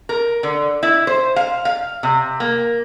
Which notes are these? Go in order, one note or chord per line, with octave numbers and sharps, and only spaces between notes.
A#4
D3
E4
C5
F5
F5
C3
A#3